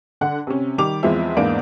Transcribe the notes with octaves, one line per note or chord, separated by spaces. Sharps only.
D3 F#5
C3 C#4
D#3 G3 D6 F7
E2 F3 G#3 C4 E5
E2 G#2 A#3 B3 D4 D7